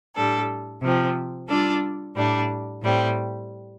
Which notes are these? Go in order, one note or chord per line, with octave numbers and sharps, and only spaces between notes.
A2 G3 D4 A4
C3 F3 C4
G3 D4 F4 A4 D5
A2 G3 D4
A2 G3 C4